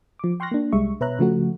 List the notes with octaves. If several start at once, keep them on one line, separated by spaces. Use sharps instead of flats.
F3 D6
G5 C6 C#6 F6 F#6 A#6
A#3 D4
C2 G3 G#3 E5 C#6
B2 B4 C#5 E5 A#5 F#6
C#3 F3 A3 F#4